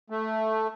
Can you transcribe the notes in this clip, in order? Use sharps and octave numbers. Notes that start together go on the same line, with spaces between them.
A3